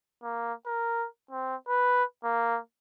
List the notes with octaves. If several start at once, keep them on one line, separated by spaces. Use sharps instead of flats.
A#3
A#4
C4
B4
A#3